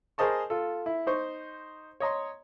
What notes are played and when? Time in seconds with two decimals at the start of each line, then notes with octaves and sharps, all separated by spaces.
0.18 G#4 A#4 C5 D#5 A5 C#6
0.50 F4 A4
0.86 E4
1.07 D#4 C5 C#6
2.00 C#5 D#5 A#5 C6